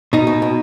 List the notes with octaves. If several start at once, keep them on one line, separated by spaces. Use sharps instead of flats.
B2 D#4
B2
B2